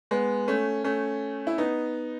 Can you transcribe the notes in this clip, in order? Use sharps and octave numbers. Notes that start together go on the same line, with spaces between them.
G#3 B3
A3 C#4
A3 C#4
E4
B3 D#4